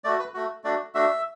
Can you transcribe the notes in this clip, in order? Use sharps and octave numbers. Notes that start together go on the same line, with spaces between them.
A3 F#4 D5
B4
A3 F#4
A3 D4 F#4 D5
A3 D4 F#4 E5